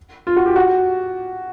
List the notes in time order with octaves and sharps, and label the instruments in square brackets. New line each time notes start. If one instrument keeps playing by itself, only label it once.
[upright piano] F4
F#4
G4
F#4